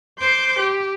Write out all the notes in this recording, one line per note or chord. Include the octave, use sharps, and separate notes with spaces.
C5 C6 D6 G6
G4